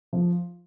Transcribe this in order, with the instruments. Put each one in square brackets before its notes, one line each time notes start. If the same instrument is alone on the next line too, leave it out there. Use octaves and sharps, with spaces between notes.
[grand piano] F3